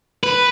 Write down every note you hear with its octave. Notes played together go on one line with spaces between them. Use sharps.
B4